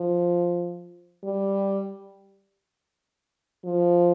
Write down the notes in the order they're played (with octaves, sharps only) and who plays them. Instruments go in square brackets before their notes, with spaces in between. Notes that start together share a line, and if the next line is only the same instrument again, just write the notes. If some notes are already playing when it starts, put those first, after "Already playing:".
Already playing: [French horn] F3
G3
F3